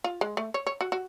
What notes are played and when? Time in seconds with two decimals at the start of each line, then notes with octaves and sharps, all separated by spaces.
0.04 F4
0.21 G#3
0.37 A3
0.54 C#5
0.67 C#5
0.81 F#4
0.92 F#4